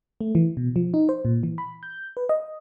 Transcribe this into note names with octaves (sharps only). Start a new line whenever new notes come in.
A3
E3
B2
F3
D#4
C5
A#2
E3
B5
G6
B4
D#5